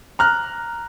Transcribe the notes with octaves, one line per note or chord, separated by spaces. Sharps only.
A#5 F6 F#6